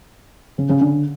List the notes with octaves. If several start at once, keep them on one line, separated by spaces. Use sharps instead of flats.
C#3
C#3
D3